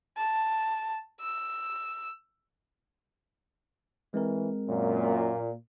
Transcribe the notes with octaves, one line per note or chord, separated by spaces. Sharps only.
A5
E6
E3 G#3 C4 A#4
F#2 A#2